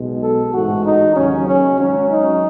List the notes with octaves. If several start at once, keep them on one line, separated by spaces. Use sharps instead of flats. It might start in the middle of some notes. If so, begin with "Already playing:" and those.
Already playing: B1 B2 G#3
A4
A1 G#2 E3 F#4
D#4
D#2 C#3 F#3 C#4
C#4
G#1 G#2 F#3 C#4
D#4